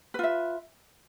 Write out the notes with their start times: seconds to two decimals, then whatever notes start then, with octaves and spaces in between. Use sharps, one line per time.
0.14 B4
0.19 F4
0.23 E5